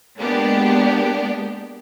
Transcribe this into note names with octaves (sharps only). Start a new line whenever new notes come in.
G#3 A#3 B3 D4 G4